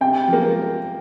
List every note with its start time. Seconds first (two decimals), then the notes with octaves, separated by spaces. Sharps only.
0.01 C3 G5
0.28 F3 A#3